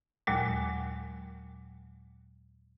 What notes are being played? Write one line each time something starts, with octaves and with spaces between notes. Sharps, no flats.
D#2 A#2 F#3 G#3